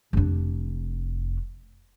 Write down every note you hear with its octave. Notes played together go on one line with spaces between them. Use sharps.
F1 D4